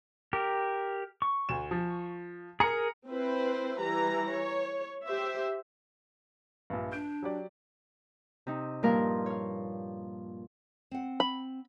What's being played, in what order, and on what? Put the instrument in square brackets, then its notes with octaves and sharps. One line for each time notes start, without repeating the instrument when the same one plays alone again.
[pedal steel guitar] G4 A#4
C#6
[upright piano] D2 E7
F3
[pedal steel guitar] G#4 A#4 [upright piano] A#5 C#7
[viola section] C4 E4 B4 C5
E3 G3 A#5
C#5
G4 C5 E5
[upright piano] A#1 G2
[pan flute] D4 [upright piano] G6 D7
[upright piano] F#3 G4 D5
[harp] C3 D#4
G2 A#2 F3 A#3 A#4 F5
C#5 F5
[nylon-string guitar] C4 F#5
[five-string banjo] B5